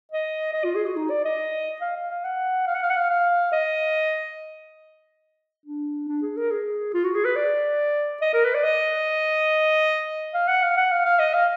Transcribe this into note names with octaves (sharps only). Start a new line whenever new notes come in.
D#5
D#5
F4
G#4
F#4
D#4
D5
D#5
F5
F5
F5
F#5
F5
F#5
F5
F#5
F5
F5
D#5
D4
D4
G#4
A#4
G#4
F4
F#4
G#4
B4
D5
D#5
A#4
B4
D5
D#5
F5
F#5
F5
F#5
F5
F5
D#5
F5